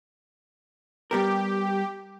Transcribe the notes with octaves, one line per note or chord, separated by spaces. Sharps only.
G3 B3 G4 A#4